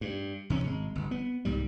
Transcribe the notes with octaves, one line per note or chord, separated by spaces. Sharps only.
G2
E2 C3 C#4
G#1 G#3
G1
B3
C2 G#2 G3